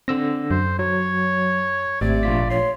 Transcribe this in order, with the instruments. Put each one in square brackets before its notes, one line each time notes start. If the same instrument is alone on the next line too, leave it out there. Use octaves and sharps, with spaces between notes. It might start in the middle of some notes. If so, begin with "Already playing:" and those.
[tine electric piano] D3 E6 A#6 [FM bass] C4
[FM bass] F#2 [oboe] C5
[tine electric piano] F#3 [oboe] C#5
[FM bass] G#1 [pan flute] A3 [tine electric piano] C4 G4 [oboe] D5
[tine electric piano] A#1 F4 B6
[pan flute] C#5 [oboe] C6